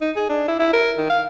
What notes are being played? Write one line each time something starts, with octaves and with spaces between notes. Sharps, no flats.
D#4
G#4
D4
E4
E4
A#4
D#3
F5